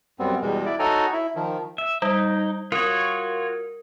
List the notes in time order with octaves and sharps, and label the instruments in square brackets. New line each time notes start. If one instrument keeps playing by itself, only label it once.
[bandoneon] F#2 G3 B3 C4
E2 B2 G3 G#3
E4 D5
D#4 F#4 A4 C#5 G#5 A#5
E4
D#3 F3
[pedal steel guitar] E5
[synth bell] G3 [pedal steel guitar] D#4
[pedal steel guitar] F4 F#4 C#5 [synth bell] A#4